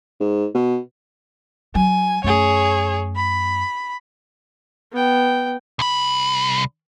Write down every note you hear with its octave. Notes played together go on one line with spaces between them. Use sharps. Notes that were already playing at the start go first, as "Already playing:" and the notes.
G#2
B2
F#3 G#5
F#2 A3 G#4 C#5
B5
B3 G5
C2 B5